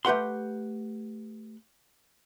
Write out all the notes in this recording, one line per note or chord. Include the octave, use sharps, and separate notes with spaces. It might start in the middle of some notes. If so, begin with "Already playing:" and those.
A3 G4 B4 F#5 C6